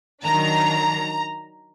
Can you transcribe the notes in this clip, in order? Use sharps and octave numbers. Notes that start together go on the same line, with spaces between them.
D#3 F#3 D4 A#5